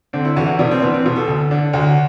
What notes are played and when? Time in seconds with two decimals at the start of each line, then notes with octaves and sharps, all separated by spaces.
0.13 D3 C4
0.25 E4
0.36 E2 F#4
0.48 E4
0.59 B2 D4
0.71 C4
0.82 E2 B3
0.94 C4
1.06 B2
1.16 A4
1.28 D2
1.51 D3
1.73 D2 F#4